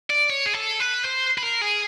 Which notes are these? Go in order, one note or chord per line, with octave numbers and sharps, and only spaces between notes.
D5
C#5
G#4
A4
B4
C5
B4
A#4
G#4